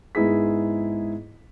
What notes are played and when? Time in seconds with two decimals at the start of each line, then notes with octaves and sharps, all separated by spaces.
0.15 G#2 B3 E4 G#4 B6